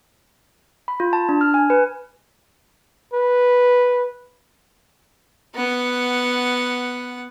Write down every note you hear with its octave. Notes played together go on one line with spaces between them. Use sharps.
B5
F4
A5
D4
F6
G#5
B4
B4
B3 F#5